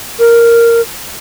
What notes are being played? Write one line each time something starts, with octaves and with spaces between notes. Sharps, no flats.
A#4